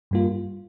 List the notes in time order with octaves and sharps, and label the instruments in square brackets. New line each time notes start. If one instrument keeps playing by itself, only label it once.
[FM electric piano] G2 G3 A#3 F4